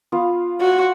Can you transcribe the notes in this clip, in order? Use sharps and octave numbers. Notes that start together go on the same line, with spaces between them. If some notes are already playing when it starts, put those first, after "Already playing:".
B3 F4 F5
F#4